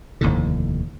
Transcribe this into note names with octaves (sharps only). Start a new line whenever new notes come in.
F1 D#2 A2 D3